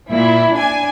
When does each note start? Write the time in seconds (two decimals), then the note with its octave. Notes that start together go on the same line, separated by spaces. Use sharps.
0.11 A#2 E4
0.54 D4 G#5